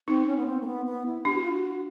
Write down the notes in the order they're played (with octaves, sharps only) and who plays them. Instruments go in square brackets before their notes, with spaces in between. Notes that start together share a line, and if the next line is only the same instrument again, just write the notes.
[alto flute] C4 [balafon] D#4
[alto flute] C#4
B3
C4
A#3
B3
B3
E4
[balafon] D4 [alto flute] G4
[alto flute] F#4
F4
F#4